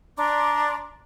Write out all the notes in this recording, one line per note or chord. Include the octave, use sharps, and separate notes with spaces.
D4 A#5 C6 D6